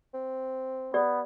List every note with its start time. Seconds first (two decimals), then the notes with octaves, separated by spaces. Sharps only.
0.14 C4
0.94 B3 G4 D5